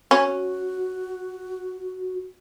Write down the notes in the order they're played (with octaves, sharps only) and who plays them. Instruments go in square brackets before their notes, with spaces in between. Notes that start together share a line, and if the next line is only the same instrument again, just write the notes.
[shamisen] C#4 [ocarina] F#4